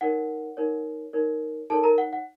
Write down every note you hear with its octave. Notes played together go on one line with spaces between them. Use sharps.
D#4 A#4 C#5 F#5
D#4 A#4 C#5
D#4 A#4 C#5
D#4 A4 A#4 C#5 A5
A#4 A#5
F#5
F#5